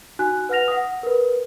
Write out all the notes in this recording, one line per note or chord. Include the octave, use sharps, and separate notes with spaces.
D#4 F#4 G#5 F#6
B4 F#5 F6 A#6 F7
F#5 D#6
A#4 B4